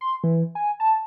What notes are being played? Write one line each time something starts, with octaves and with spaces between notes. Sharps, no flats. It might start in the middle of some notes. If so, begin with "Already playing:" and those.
C6
E3
G#5
A5